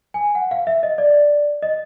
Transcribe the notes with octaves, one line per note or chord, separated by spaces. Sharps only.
G#5
F#5
F5
E5
D#5
D5
D#5